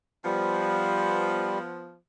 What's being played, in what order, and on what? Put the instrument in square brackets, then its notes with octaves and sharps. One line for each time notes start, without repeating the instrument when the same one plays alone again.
[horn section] F3 B3 [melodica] G3